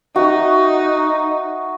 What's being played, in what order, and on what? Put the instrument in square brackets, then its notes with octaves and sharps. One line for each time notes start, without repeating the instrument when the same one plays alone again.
[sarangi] D#4 [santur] F#4 E5